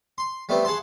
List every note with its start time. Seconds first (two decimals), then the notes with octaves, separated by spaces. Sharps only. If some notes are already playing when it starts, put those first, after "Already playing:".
0.18 C6
0.49 G3 A3 B3 C4
0.65 G#4 F#5 A5 C6